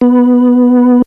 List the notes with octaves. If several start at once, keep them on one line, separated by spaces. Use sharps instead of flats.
B3